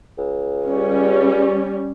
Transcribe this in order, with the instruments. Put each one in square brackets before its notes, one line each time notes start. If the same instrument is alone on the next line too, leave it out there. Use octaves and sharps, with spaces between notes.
[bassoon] C#2
[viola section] G3 C#4